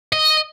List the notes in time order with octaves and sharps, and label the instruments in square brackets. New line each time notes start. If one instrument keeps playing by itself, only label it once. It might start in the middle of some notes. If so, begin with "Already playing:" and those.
[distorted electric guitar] D#5